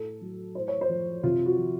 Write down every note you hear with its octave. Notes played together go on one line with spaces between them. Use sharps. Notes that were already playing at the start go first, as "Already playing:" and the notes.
Already playing: A2 A4
F#3
A2 C5
C#5
C5
F3
C3 F4
F#4
F3